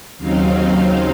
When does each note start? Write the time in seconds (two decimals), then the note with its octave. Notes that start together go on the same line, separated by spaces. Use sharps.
0.17 D#2 C#3 F#3 C4 D#4 F5